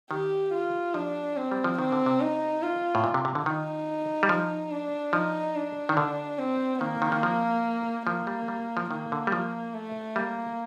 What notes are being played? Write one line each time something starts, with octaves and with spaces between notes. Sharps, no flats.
D#3 G4
F4
F3 D4
C4
G3
F3
D#3 C4
D3
C3
D#4
F4
A2
A#2
C3
C3
D3
D#3 D#4
G3
F3
D4
F3 D#4
D4
D#3
D3
C4
D#3 A#3
D#3
D#3
F3
F3 A#3
G3
G3
F3
D#3 A#3
D3
G3
F3
A3
G3 A#3